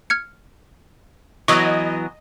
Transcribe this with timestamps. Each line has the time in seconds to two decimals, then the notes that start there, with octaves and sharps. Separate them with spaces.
0.10 F6 G#6 C#7
1.48 E3 F#3 B3 D#5 C#6 E6 A#6